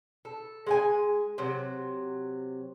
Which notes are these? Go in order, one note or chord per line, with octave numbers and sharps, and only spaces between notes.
A4
G#3 F#5 G#5
C3 F#3